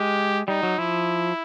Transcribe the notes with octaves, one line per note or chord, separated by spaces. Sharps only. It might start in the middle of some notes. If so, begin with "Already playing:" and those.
Already playing: G#3 G4
G3 D#4
F#3
F3 E4